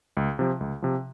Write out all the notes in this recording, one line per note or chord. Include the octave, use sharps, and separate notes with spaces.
C#2
C3 F3
C#2
C3 F3